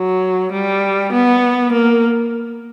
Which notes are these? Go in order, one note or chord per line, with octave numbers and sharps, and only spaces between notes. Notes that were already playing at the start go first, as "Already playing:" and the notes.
Already playing: F#3
G3
B3
A#3